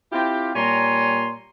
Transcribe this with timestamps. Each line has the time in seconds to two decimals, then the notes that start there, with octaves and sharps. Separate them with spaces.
0.12 C4 E4 F4 G4
0.56 A#2 G3 C#5 G#5 A#5 C6